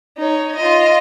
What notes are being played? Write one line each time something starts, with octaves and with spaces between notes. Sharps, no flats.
D#4 C#5
F4 D#5